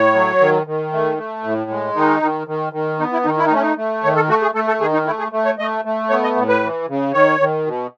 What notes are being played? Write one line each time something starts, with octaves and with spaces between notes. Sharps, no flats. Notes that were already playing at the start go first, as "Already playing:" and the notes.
Already playing: A2 C#5
F#3
D#3
D#3
A3
A3
A2
G#3
D#3 D#4
D#3
D#3
D#3
B3 D#4
E4
D#3 D#4
E4
D#4
A3 C#4
D#4
A3
D#3 C#5
A4
A3 F#4
G#4
A3 A4
A4
D#3 G#4
D#4
A3 E4
G#4
A3
C#5
A3 D#5
A3
B3 C#5
D#5
A2
B4
E3
C#3
D#3 C#5
D#3
B2